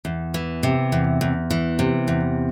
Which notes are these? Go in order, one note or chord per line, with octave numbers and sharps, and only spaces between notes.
E2
E3
C3
E2
E2
E3
C3
E2